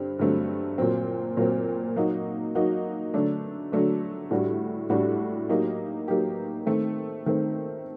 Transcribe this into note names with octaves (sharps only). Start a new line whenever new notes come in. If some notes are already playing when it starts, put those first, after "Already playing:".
Already playing: G2 D3 C4
G2 D3 F#3 A3 C4
A#2 F#3 C4
A#2 F#3 C4
F#3 A#3 D#4 F#4
F#3 A#3 D#4 F#4
D3 F#3 A3 D4
D3 F#3 A3 D4
A2 G3 D4 F#4
A2 G3 D4 F#4
F#3 A#3 D#4 G4
F#3 A#3 D#4 G4
D#3 A3 C4
D#3 A3 C4